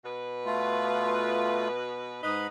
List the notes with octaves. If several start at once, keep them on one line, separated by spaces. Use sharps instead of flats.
B2 B4
A3 F4
G#2 D#4 B4 D#5 B5